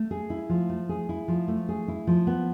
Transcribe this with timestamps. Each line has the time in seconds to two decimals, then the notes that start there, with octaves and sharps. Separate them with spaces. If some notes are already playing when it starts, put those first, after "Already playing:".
Already playing: A3
0.11 G#4
0.30 E4
0.49 F3
0.70 A3
0.89 G#4
1.09 E4
1.28 F3
1.48 A3
1.69 G#4
1.88 E4
2.07 F3
2.27 B3